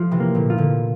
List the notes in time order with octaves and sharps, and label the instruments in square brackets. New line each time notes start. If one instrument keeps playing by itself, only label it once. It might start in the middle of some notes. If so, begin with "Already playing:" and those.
Already playing: [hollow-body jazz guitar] F3 [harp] A3
[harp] C3 E3
[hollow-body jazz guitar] A#3
[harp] A#2 D3
[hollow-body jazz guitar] F4
[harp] A#2 D3